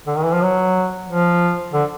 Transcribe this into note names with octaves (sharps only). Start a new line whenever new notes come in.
D3
D#3
E3
F3
F#3
F3
D3